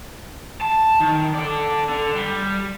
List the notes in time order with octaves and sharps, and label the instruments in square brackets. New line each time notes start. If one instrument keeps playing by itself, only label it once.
[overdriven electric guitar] A5
D#3
A4 D5
D3
G3